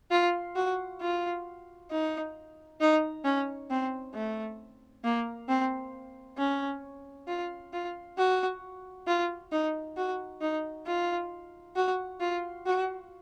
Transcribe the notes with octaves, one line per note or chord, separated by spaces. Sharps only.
F4
F#4
F4
D#4
D#4
C#4
C4
A3
A#3
C4
C#4
F4
F4
F#4
F4
D#4
F#4
D#4
F4
F#4
F4
F#4